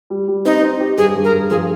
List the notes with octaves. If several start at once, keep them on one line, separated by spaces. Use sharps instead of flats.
G3
G3
C4 D#4
C4
G4
G2 G#4
G2
A#4
G2
F3 G#4